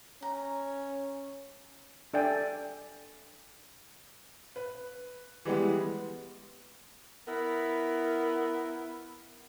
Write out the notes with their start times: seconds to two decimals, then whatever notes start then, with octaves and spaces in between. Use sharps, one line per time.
0.22 C#4 A#5
2.14 D4 A4 D5 E5 G5 G#5
4.56 B4
5.45 E3 G3 G#3 B3
7.27 B3 E4 A#4